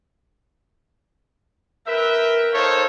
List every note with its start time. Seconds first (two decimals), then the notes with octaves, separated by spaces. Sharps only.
1.87 A#4 B4 E5 G5
2.54 D#4 A4 C5 C#5 F5